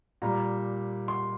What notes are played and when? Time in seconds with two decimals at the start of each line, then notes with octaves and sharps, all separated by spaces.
0.22 A#2 G3 A#5
1.08 C6